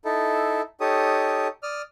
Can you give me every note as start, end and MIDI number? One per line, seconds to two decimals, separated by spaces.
0.05 0.61 63
0.05 0.61 64
0.05 0.61 69
0.81 1.48 63
0.81 1.48 67
0.81 1.48 69
0.81 1.48 73
0.81 1.48 87
1.63 1.82 74
1.63 1.82 87
1.63 1.82 89